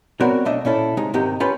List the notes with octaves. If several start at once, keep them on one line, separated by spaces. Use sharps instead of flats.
B3 C4 F#4 A#4 C#5 D5
B1 B2 A3 D4 D#5 E5
A#2 C#4 E4 A4
C3 G#3 D#4
G#2 C3 D#3 D#4 G4
C#4 F4 G4 B4 B5